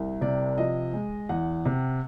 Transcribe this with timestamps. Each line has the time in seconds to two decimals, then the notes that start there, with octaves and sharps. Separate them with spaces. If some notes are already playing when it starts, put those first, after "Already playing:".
Already playing: C2
0.21 C3 D5
0.57 F3 D#5
0.93 G#3
1.29 E2 F#5
1.65 C3